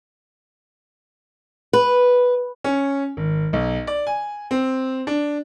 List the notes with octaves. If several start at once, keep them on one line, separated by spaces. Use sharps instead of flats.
B4
C#4
G#1
B1
D5
G#5
C4
D4